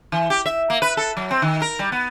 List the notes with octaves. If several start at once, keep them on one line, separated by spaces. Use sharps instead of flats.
E3
G4
E5
A#3
B4
A4
F#3
C4
D#3
A#4
G3
B3